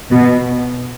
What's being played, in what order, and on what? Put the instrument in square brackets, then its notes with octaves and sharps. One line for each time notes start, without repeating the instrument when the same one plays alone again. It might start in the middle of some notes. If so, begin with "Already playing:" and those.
[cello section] B2